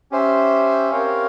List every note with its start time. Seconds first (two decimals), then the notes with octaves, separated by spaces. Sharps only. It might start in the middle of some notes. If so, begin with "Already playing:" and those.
0.11 C#4 G4 C5 E5
0.91 C4 G4 A#4 C#5 F5